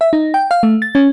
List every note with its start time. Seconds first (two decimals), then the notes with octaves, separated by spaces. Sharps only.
0.01 E5
0.13 D#4
0.34 G5
0.51 F5
0.63 A3
0.82 A6
0.95 C#4